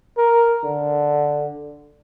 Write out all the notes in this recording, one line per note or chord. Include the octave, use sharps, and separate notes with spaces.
A#4
D3